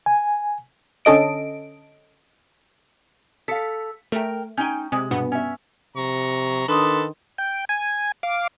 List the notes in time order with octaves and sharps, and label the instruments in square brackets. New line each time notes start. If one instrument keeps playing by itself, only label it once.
[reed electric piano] G#5
[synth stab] D3 C#4 A4 D#5 D7
[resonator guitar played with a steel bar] A4 F5 [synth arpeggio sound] B6 C#7
[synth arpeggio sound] A3 [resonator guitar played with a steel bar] A#4 G5
[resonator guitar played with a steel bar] C#4 D#4 G5 [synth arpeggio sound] G#5 G6
[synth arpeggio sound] C3 [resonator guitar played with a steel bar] G#3
[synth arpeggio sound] G2 B2 B3
[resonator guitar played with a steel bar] C#4 E5
[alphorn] C3 [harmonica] A#5 C#6
[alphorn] D#3 [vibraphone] D4 C6 D#6 [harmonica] A4 B4
[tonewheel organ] G5
G#5
F5 D6